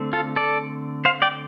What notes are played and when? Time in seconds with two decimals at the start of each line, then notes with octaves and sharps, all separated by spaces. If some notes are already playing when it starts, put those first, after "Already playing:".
Already playing: D3 A3 C4
0.13 F4 A4
0.36 A4 D5
1.05 C5 F5
1.22 D5 G5